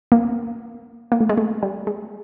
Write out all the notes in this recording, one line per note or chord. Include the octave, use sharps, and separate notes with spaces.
A#3
A#3
A3
G#3
A3
G3
G#3